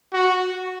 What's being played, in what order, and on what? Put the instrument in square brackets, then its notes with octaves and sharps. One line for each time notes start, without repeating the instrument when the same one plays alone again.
[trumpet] F#4